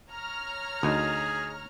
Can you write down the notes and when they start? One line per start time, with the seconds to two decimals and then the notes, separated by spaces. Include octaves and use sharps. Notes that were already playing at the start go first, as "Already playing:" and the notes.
0.10 C#5 A#5 F6
0.83 D2 D#4 F#4 G#4